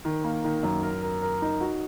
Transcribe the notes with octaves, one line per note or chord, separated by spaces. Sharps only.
D#3
A#3
D#3
F#2
A#4
A#4
A#4
D#4
F#4